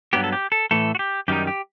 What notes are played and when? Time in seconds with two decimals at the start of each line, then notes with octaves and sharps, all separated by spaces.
0.13 G2 F#3 B3 G4
0.24 A4
0.33 G4
0.52 A4
0.71 A2 E3 A3 A4
0.95 F#4
0.99 G4
1.28 F#2 D#3 G3 D#4 G4
1.47 G4